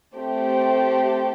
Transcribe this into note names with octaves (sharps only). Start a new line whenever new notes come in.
A3 C4 G4